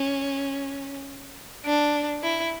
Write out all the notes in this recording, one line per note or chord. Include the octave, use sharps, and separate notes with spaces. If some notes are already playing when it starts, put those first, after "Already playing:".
Already playing: C#4
D4
E4